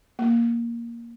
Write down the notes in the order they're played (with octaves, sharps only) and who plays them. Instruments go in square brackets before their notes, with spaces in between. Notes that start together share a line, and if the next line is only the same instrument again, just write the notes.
[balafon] A#3